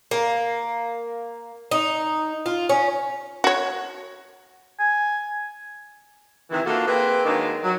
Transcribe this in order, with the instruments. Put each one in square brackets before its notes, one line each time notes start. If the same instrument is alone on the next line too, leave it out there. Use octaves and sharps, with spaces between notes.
[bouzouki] A#3
D#4
F4
C#4
[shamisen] F#4 C#5
[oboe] G#5
[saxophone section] C3 D#3 E3
A#3 D4 D#4 F4 F#4 A4
A#3 C4 G#4 B4
D#3 F#3 G#3 A#3 D4 D#4
F#3